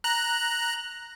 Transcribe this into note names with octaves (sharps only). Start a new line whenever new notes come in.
A#5 F#6